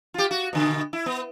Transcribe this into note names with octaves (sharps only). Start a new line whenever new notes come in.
F4 G4
F#4
B2 D3
E4
B3